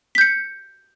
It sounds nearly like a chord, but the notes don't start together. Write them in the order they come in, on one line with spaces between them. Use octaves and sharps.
B6 G6 C#7